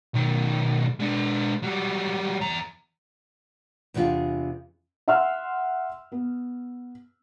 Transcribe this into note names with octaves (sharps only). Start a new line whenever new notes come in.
B1 D#3
G#3 D4
F#3 G3
E2 A#5
E2 C3 D4 D#4 F4 G#4
E5 F#5 C6 E6 F6
B3